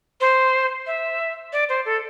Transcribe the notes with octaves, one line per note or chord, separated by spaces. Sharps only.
C5
E5
D5
C5
A4